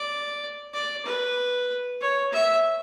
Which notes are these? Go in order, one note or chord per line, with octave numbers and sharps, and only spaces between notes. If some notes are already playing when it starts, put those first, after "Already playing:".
Already playing: D5
D5
B4
C#5
E5